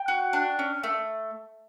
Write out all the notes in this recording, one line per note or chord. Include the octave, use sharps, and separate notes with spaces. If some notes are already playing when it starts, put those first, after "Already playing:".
Already playing: G5
F#4
D4
C#4
A3